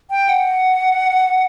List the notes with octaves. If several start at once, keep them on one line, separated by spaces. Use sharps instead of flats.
G5
F#5